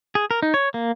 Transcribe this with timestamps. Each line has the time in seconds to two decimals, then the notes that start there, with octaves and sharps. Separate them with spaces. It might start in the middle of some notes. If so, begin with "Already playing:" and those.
0.15 G#4
0.31 A#4
0.43 D#4
0.54 C#5
0.74 A#3